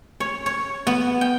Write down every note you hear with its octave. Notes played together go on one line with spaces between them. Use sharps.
C#5
C#5
B3
G5